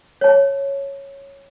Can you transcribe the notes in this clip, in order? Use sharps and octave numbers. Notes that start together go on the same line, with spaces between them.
C#5 A5